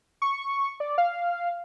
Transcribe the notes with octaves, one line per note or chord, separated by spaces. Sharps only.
C#6
D5
F5